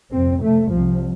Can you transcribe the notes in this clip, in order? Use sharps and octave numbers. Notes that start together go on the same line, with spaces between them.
F2 C3 C4
F2 C3 A3
C2 C3 F3